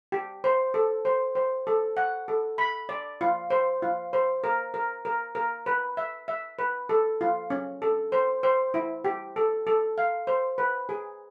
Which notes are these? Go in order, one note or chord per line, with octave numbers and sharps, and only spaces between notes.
G4
C5
A4
C5
C5
A4
F#5
A4
B5
D5
F4
C5
F4
C5
A#4
A#4
A#4
A#4
B4
E5
E5
B4
A4
F4
C#4
A4
C5
C5
E4
G4
A4
A4
F5
C5
B4
G#4